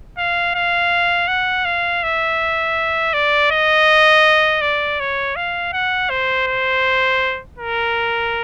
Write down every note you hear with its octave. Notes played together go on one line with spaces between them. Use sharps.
F5
F5
F#5
F5
E5
D5
D#5
D5
C#5
F5
F#5
C5
C5
A#4